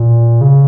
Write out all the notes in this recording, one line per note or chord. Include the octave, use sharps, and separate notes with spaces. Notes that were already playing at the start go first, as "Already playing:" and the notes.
Already playing: A#2
C#3